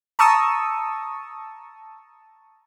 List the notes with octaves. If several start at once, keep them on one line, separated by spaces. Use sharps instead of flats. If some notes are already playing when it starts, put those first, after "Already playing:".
A5 A#5 C#6 D#6 E6